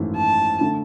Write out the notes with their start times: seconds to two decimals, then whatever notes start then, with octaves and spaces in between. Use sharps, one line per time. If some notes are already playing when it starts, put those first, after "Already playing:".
Already playing: G#1 F#2 E3 A3
0.16 A5
0.60 D3 A3